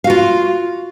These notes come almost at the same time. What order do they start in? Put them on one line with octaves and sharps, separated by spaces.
F5 F#4 F4